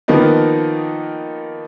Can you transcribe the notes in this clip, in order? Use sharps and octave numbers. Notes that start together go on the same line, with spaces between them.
D#3 F3 A#3 B3 D#4